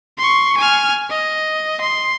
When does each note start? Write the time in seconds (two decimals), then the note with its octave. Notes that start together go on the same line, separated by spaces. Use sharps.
0.18 C6 C#6
0.57 G#5 F6
1.10 D#5
1.81 C6